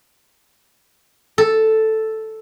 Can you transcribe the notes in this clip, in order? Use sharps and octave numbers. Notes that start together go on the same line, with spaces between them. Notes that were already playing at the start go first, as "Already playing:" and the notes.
A4